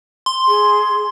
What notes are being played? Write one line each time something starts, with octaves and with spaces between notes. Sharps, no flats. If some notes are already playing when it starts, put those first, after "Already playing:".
C6
G#4